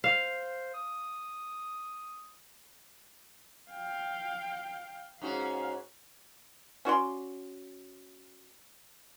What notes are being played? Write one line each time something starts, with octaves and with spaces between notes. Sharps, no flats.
C5 F5
D#6
F5 G5
G#2 C#4 F#4 F5
C#4 F#4 D5 C6